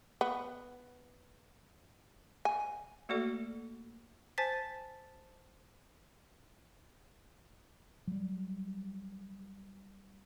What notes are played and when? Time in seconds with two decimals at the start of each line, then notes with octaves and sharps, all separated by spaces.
0.21 B3
2.45 G#5
3.09 A3 A#3 F#4 A4 D5
4.38 C5 G#5 A5 A6 B6
8.07 F#3 G3